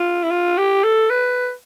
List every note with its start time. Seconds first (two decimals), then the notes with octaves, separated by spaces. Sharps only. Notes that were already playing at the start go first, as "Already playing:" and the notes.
Already playing: F4
0.24 E4
0.31 F4
0.57 G4
0.84 A4
1.10 B4